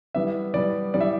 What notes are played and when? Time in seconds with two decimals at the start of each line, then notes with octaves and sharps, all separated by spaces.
0.15 E3 G3 B3 E5
0.54 E3 G3 B3 D5
0.94 E3 G3 B3 D5
1.01 E5